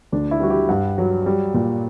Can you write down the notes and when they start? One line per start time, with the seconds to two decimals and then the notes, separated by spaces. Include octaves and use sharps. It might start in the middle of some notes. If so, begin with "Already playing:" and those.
0.12 D2 D4
0.31 E4
0.40 G3 F#4
0.50 G4
0.69 G2 F#5
0.98 F#3
1.26 G3
1.54 A#2